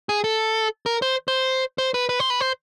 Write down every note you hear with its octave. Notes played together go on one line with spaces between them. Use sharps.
G#4
A4
A#4
C5
C5
C5
B4
B4
C5
B4
C5